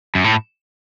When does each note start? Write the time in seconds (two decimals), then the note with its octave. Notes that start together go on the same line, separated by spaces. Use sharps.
0.15 F#2
0.24 A2